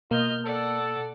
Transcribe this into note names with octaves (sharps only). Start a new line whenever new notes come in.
B2 A#3 F4 D#5 F6 G6
A4 D5 F#5